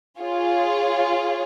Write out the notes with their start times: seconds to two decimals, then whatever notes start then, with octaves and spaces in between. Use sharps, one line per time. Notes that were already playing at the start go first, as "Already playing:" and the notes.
0.21 F4 G#4 C#5